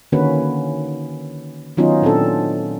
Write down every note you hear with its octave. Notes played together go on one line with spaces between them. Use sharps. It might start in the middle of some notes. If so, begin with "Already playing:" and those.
D3 D#3 A#3 C#4 F#4 B4
D#3 F#3 B3 C#4 D#4 F4
A#2 C4 D4 A4